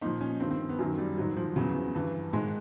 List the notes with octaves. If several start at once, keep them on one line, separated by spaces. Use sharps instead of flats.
A#2 F3 D#4
C#4
G2 D#3 C4
C4
B3
F#2 D#3 F#3
G3
G#2 D#3 F#3
F3
E2 C#3 E3 F#3
G2 E3
G#2 D#3 G#3